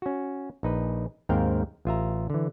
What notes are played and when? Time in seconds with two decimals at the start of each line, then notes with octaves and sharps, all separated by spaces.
0.02 C#4 F#4
0.63 A#1 D#4 B4
1.29 D#2 G#2 C4 A#4 F5 G5
1.85 A1 F4 E5 A#5
2.30 D3 E3